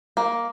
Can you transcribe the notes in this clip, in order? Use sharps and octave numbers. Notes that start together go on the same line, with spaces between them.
A#3